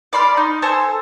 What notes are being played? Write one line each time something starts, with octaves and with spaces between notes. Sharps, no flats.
D5 B5 C6 F6
D#4
A4 C5 G#5 E6